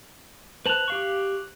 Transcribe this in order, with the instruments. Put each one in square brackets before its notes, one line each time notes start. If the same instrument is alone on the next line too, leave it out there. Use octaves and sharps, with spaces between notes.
[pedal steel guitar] B4 C5 A5 [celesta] F#6 F7 F#7
[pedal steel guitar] G4 F5 C#6